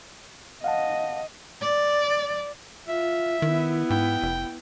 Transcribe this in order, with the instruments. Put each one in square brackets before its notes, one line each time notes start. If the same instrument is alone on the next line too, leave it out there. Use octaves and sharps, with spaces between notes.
[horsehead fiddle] D#5 [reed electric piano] F5 F#5 A5
[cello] D5
[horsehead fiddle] F4 [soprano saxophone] E5
[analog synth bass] D#3 [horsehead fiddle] B3 E4
[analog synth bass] G#2 [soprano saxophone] G5
[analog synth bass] F1